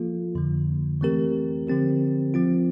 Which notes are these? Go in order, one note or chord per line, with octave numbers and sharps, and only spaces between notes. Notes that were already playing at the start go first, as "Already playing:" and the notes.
Already playing: F3 A#3 F4 A4
F2 D3 F3 A#3
E3 A3 C4 G4 A#4
D3 F3 C4 G4 A#4
F3 C4 F4